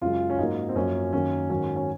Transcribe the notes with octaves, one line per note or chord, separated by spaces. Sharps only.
F#2 C#3 G#3 F4
C#4
G#2 F#3 A#3 D#4
C4
F#2 F3 A#3 C#4
F#2 D#3 F#3 A#3 C#4
G#2 D#3 F#3 C#4
C#4